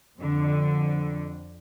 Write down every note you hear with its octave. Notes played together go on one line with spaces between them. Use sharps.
F2 D3